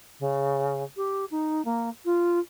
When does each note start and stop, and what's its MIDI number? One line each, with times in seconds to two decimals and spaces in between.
0.19 0.83 49
0.96 1.25 67
1.31 1.64 63
1.65 1.89 58
2.05 2.39 65